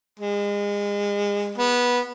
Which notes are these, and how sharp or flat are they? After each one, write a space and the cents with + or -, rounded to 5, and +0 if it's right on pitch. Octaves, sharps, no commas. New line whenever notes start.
G#3 -30
B3 -15